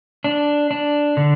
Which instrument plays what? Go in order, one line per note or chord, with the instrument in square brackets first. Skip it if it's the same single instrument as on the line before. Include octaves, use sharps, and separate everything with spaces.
[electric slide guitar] D4
D4
D3